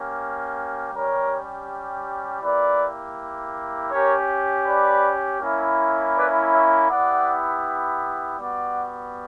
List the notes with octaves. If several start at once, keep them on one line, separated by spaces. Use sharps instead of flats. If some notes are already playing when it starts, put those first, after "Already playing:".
Already playing: A#3 C#4 G4
G3 C#4 G4 A#4 C#5
A#3 E4 G4 B4 D5
C#4 G4 A#4 C#5
B4 D5
A#3 C#4 E4
B4 D5
C#5 E5
B3 E4 G4 D5 F#5
G3 B3 F#4 D5 F#5